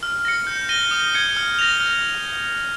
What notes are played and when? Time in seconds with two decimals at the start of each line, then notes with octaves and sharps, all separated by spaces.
0.03 F6
0.25 A#6 C#7
0.47 G6
0.69 A#6 D#7 G7
0.91 D#6
1.14 G#6 C#7
1.37 F6
1.59 A#6 F7
1.80 F6